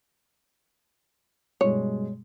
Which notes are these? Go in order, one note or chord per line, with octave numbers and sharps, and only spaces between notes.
G2 B2 G#3 C#5